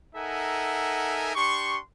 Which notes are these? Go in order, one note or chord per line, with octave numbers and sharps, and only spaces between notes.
D#4 A4 A#4 E5 F#5 G#5
D4 G4 C6 C#6